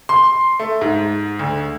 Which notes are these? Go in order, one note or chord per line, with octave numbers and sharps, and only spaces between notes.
C6
A3
G#2
D2